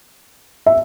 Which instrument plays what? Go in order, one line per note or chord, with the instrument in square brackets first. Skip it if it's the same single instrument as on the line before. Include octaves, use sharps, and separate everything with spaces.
[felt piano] E5